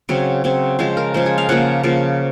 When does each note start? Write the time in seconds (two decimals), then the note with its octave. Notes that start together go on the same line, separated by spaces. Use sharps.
0.09 C#3 F#3 C4
0.44 C#3 F#3 C4
0.79 C#3 F3 G#3 C5
0.97 A#4
1.14 C#3 F3 G#3 C5
1.26 G#4
1.38 F5
1.49 C#3 F3 A#3 F#5
1.83 C#3 F3 A#3